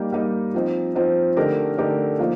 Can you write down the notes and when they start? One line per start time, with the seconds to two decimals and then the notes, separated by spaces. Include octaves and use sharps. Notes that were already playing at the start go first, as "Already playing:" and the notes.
Already playing: G3 A#3 D#4 G4
0.12 G3 A#3 D#4 G4
0.54 F3 C4 D#4
0.95 F3 C4 D#4
1.36 D3 A3 D#4 G4 A#4
1.78 D3 A3 D#4 G4 A#4
2.19 F3 A#3 D#4